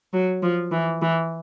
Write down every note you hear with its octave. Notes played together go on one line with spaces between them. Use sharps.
F#3
F3
E3
E3